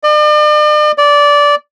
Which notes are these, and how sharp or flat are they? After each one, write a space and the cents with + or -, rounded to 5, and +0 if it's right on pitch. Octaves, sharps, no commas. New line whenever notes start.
D5 +45
D5 -15